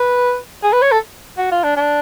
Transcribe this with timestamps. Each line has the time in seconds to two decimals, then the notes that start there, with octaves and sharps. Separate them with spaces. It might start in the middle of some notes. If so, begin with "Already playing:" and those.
Already playing: B4
0.63 G#4
0.73 B4
0.82 C#5
0.92 A4
1.38 F#4
1.51 F4
1.63 D4
1.76 D4